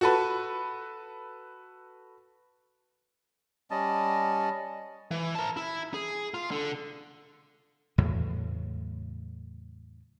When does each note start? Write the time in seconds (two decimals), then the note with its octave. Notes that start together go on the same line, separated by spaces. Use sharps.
0.01 F#4 A4 B4
3.71 G3 C#4 D#5 A5
5.11 E3
5.35 A#4 A5
5.57 E4
5.94 G#4
6.34 F4
6.51 D3
7.98 E2 A2 C#3 F#3